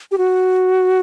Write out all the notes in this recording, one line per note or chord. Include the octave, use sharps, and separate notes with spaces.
G4
F#4